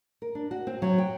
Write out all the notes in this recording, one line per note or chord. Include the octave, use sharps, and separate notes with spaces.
A#4
D4
F#4
C4
F#3
G5